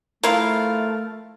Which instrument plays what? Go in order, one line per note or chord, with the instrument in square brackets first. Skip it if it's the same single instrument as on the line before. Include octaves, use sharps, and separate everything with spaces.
[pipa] F3 E4 F4 [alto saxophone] A3 [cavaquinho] A#4 F5